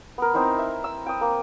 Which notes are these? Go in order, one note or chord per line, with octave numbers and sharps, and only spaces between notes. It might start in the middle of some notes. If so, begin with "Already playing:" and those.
B3 A#4
C4 D#4 E4 C5
E5
E6
G5 D#6
A#3